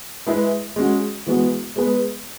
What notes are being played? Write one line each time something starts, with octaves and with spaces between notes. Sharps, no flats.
G#3 E4 G#4 B4
G#3 C#4 F#4
E3 G#3 B3 F#4
G#3 B3 G#4 B4